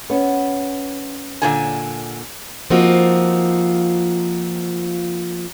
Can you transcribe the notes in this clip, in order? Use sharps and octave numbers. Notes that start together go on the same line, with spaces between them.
B3 C#4 F#5
A#2 D3 G#5
F3 A#3 C4 D#4 F4 F#4